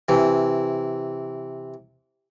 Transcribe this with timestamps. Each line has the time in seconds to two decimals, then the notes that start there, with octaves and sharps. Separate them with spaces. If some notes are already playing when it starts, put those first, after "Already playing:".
0.09 C3 E3